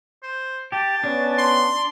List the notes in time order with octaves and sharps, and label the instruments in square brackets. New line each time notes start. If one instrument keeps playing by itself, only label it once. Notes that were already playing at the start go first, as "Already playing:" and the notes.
[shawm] C5
[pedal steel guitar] G4 [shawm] A5
[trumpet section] B3 C#4 [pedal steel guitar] D4
[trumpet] C6